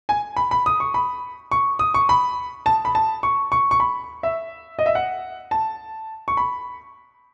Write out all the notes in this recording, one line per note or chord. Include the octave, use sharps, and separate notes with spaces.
G#5
B5
B5
D#6
C#6
B5
C#6
D#6
C#6
B5
A5
B5
A5
C#6
C#6
C#6
B5
E5
D#5
E5
F#5
A5
C#6
B5